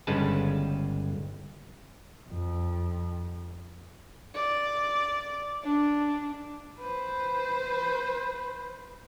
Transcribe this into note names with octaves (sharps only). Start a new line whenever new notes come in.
G1 C#3 G3 G#3 B4 A5
F2
D5
D4
B4 C5